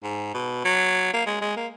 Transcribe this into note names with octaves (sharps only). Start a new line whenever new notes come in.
G#2
B2
F#3
A#3
G#3
G#3
A#3